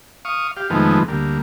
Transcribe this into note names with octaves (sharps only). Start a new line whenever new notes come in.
F5 C#6 D#6
G4 F5
F2 D#3 F3 G#3 A3 B3
D2 G3 A#3